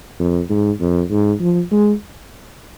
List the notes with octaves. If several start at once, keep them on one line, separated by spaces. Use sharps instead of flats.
F2
G#2
F2
G#2
F3
G#3